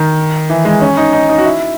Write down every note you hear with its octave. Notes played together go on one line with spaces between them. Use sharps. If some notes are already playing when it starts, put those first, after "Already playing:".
Already playing: D#3
E3
G#3
C#4
D#4
D#4
D#4
F#4
E4